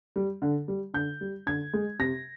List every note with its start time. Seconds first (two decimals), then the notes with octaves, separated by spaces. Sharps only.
0.16 G3
0.42 D3
0.68 G3
0.94 D3 G6
1.21 G3
1.47 D3 G#6
1.73 G#3
1.99 C3 A#6